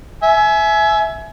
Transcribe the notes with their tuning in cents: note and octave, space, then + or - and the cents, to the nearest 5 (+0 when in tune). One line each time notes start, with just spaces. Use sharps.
E5 +0 G#5 +30